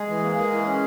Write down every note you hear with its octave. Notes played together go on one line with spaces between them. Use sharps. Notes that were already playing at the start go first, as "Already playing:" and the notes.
Already playing: G#3 G#4
E3
A#3
A#3
E3
C#4